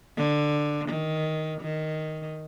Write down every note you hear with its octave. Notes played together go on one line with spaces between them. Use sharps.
D3
D#3
D#3